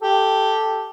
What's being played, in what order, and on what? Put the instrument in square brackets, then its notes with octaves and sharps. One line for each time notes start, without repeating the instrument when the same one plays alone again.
[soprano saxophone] G4 [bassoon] A4